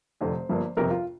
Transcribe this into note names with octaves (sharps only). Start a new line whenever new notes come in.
F1 F2 D3 C5
G1 G2 F3 A#3
G1 F2 C3 A#4
F4